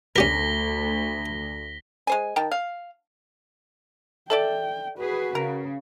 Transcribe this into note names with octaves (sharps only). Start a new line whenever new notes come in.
D2 C#4 G4 A#4 A#6 B6 G7
G#3 C5 G#5
D#3 G5 A5
F5
A4 D5 E5 G5 A5
F#4 G#4 B4
C#3 A#4